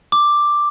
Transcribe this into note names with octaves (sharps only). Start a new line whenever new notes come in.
D6